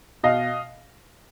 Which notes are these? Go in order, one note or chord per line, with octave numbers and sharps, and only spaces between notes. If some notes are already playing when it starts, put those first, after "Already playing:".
B2 D#5 F5